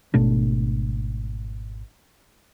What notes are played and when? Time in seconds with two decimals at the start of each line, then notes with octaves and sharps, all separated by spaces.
0.14 G#1 B2 A3 D4